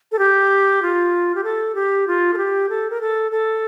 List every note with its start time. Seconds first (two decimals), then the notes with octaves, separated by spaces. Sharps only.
0.12 A4
0.19 G4
0.82 F4
1.35 G4
1.44 A4
1.75 G4
2.07 F4
2.34 A4
2.37 G4
2.69 A4
2.90 A#4
3.01 A4
3.31 A4